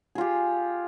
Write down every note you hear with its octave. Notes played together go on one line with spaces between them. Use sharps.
F4 G4 G#4